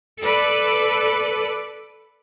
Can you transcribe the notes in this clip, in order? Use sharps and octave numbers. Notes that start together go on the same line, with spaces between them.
A4 B4 D5